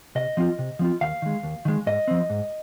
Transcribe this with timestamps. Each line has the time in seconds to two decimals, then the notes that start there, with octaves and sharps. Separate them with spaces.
0.15 C3 D#5
0.37 F3 C4 F4
0.59 C3
0.79 F3 C4 F4
1.01 D#2 F5
1.22 D#3 G#3
1.43 D#2
1.65 D#3 G#3
1.87 G#2 D#5
2.08 F3 C4
2.30 G#2